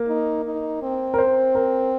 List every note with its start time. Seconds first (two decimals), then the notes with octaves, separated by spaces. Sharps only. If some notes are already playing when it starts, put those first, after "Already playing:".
Already playing: A#3
0.08 D#4
0.45 D#4
0.83 C4
1.14 A#4
1.18 C5
1.55 A#4